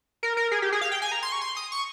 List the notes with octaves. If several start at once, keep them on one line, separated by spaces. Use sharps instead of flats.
A#4
A#4
G#4
G4
G#4
F5
G5
G#5
A#5
C6
C#6
C6
D#6
C#6